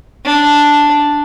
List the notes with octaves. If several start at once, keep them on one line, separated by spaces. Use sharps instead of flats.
D4